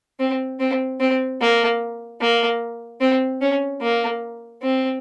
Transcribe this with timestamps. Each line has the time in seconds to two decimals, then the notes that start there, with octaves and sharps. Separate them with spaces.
0.19 C4
0.60 C4
1.00 C4
1.41 A#3
2.21 A#3
3.01 C4
3.41 C#4
3.81 A#3
4.62 C4